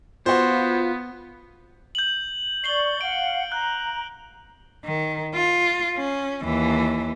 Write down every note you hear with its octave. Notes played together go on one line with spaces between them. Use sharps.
B3 F4 F#4 C5
G6 F#7
D5 C#6 C7 F#7 G7
F5 F#5 D7
A#5 F#6
D#3
F4
C#4
D#2 E3